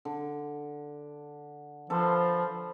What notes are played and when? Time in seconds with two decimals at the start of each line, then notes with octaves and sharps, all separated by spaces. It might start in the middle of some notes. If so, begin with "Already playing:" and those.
0.05 D3
1.90 F3 A4 B4 C5